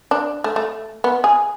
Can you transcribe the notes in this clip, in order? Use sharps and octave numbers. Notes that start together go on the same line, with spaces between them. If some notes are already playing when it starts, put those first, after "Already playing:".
D4
A3
A3
B3
G#4